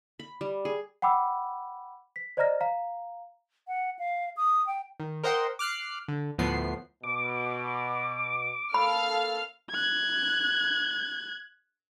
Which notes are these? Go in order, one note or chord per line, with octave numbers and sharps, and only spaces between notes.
B5
G3
G#4
F#5 G5 B5 D6 E6
B6
C5 D5 D#5 A#5 F6 A#6
F5 A#5
F#5
F5
D#6
G5
D#3
A#4 C5 D#5 F#5 G5 C6
D6 F6 F#6 C7
D3
D2 A2 F3 B3 C7
B2 D6
A#3 A4 F5 B5 F6
F#6 G#6